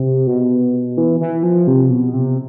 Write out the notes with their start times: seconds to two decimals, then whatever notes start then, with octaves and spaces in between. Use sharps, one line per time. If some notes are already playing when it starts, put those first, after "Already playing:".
Already playing: C3
0.27 B2
0.98 E3
1.20 E3
1.43 F3
1.67 C3
1.90 B2
2.14 C3